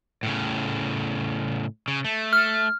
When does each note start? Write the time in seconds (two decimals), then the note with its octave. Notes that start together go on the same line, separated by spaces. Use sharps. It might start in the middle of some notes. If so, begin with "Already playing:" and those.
0.23 A2 C#3
1.88 C#3
2.05 A3
2.33 F6